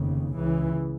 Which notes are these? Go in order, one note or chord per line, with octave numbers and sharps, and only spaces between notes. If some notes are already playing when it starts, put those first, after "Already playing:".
Already playing: F1 D#2 C#3
C#2 C#3 E3